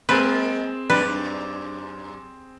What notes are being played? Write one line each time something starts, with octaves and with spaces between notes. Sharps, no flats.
G#3 A#3 C4 G#4 A#4 B4
F#2 G4 B4 D5